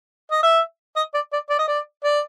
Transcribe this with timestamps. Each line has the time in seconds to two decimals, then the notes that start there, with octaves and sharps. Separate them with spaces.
0.32 D#5
0.43 E5
0.96 D#5
1.14 D5
1.33 D5
1.50 D5
1.59 D#5
1.68 D5
2.04 D5